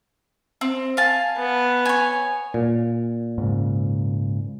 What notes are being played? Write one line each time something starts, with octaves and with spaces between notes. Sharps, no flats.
C4
F5 G#5 A5
B3
C#5 G#5
A#2
G#2 C#3